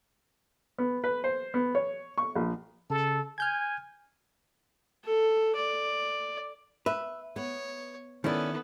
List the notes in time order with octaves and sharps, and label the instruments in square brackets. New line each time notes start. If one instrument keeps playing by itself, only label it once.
[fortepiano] B3
B4
C5
B3
C#5
C#6
A#1
[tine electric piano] C#3 [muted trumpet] A4
[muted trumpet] G#5 [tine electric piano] F6 G6 G#6
[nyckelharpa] A4
D5
[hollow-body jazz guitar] B4 [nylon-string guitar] E5
[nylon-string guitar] B3 [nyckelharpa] C#5
[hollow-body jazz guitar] D#3 E4 [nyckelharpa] B3 A4 [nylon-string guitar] C#4 D5